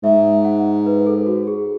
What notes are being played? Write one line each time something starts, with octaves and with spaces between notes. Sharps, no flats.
G#2 E5
F#5
B4
A4
F#4
G#4